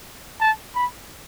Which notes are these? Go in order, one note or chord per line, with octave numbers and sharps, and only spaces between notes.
A5
B5